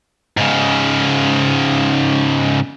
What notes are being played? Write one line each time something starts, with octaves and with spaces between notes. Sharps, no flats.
G#2 C#3